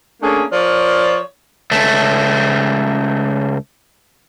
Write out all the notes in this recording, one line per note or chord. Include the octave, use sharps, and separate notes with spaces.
A3 A#3 C#4 D4 G#4
F3 A#4 C#5 D5
C#2 A3